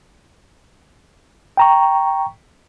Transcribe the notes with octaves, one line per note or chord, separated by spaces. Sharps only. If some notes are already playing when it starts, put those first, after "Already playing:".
G5 A#5 C#6